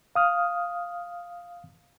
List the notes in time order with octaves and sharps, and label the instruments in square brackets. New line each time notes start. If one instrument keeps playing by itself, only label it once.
[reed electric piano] F5 D#6 F6